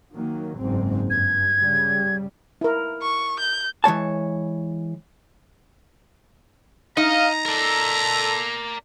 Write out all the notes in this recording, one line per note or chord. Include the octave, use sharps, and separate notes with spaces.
D#3 F#3 A#3
F#1 G#2 C4
G2 G#6
C#3 G3
E4 A#4
C#6
G6
E3 G#3 C#5 A5
D#4 D#5 F5 A#5
A4 A#4 D5